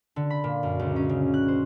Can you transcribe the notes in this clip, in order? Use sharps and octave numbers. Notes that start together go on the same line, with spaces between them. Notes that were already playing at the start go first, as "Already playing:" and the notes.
D3
B5
A#2
F#2
C#2
C#4
C#3
F#6
C5